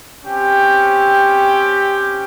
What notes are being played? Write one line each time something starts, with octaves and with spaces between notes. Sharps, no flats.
C4 C#4 G4